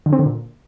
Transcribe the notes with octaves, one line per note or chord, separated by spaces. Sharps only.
D3
C4
D3
A#2